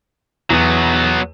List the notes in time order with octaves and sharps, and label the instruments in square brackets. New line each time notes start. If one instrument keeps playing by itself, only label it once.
[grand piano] E2 [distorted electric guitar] F#3 B3